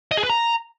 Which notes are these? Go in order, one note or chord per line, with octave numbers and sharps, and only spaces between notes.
D#5
G#4
B4
A#5